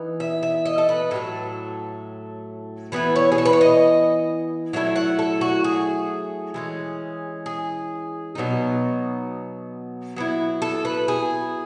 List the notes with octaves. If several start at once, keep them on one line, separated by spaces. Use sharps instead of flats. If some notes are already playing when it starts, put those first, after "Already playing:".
Already playing: E3 B3 D#4
E5
E5
D#5
A4
B4
A2 F#3 A3 A4
E3 B3 E4 B4
C#5
G#4
A4
B4
C#5
D#5
F#3 A3 E4 E5
F#5
A4
F#4
G#4
E3 G#3 C#4
G#4
B2 F#3 B3 D#4
F#3 B3 E4
A4
B4
G#4